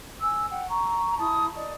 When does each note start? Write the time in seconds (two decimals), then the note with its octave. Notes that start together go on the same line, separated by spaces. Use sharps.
0.22 G#5 E6
0.50 F#5 G5
0.69 A#5 C#6
1.17 E4 A5 D#6
1.55 D5 D#5